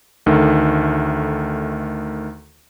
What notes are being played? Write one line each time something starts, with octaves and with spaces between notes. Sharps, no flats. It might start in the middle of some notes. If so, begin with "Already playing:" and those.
D2 D#3 A3